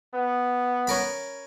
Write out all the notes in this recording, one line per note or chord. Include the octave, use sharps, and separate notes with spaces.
B3
C#4 A#4 B5